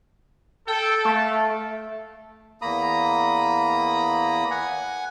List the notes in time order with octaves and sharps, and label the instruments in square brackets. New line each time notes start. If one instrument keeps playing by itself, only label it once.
[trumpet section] A4 [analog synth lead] G5
[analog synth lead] A3 [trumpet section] A4 F5 A5
[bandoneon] E2 A#3 A#5 B5 D#6
F#5 G#5